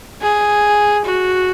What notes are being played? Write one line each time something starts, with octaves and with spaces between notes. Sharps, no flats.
G#4
F#4